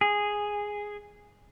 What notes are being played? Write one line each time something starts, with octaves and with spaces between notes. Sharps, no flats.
G#4